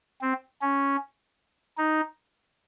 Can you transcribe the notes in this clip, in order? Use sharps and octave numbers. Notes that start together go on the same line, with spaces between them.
C4
C#4
D#4